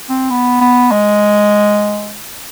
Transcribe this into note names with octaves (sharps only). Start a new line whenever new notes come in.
C4
B3
B3
G#3